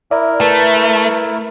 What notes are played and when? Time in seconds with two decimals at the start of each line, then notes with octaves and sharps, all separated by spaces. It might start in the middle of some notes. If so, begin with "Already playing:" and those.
0.11 E4 A#4 D5 E5
0.41 A3 B4